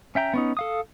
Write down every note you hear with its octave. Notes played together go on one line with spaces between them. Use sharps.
C#4 E5 G5 A#5
B3 C#4 D#4
A4 F5 D#6